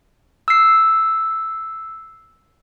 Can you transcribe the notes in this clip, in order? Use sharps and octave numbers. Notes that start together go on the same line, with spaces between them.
E6 C7